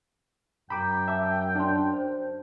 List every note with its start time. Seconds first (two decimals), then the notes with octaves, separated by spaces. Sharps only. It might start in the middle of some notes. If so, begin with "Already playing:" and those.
0.70 F#2 G5 A#5 B5 D6
1.08 E5 A5 D6
1.55 D4 A5 C6
1.93 C5